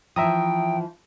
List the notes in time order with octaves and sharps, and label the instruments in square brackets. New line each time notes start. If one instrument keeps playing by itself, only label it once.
[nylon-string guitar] E3 F3 [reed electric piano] E5 A#5 D#6 [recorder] G5